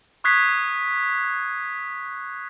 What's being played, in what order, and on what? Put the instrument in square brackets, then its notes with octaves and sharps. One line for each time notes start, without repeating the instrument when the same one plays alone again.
[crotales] C#6 D#6 F#6 G#6 B6 C7